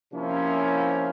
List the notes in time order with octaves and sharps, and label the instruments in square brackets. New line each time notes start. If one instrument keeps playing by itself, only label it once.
[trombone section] C3 F3 A#3 C#4 E4